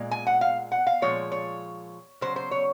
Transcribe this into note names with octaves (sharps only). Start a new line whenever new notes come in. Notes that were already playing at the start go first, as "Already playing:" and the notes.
Already playing: A#2 G#3
G#5
F#5
F5
F#5
F5
A#2 F3 G#3 C#5
C#5
C#3 F#3 C5
C5
C#5